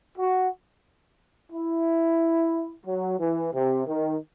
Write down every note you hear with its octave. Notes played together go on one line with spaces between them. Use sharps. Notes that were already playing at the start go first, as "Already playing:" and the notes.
F#4
E4
F#3
E3
C3
D#3